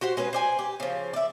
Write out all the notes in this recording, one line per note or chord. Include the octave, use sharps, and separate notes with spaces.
F#4 G4 C5 F#5
G#3 C#4 F#4 B4
C5 D5 G#5
G4
C#3 F3
D5 E5